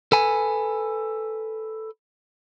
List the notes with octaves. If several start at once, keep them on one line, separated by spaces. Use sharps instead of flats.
A4 B4 G#5